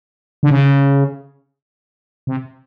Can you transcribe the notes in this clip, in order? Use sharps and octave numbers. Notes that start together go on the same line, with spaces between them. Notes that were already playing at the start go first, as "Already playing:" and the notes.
D3
C#3
C3